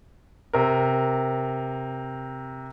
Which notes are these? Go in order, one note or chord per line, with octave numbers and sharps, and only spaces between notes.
C3 A#4